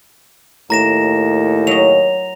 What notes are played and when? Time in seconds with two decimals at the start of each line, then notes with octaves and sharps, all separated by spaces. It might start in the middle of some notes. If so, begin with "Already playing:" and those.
0.70 D#2 A2 A#5 A#6 E7
1.67 F#3 D#5 F7